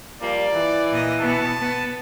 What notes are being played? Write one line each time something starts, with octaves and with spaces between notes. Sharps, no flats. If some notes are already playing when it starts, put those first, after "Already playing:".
F3 G3 A#3 D5
E3
A#2 D#5
B2 B3 A5
B3